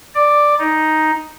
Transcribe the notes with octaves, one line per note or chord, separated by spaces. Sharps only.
D5
D#4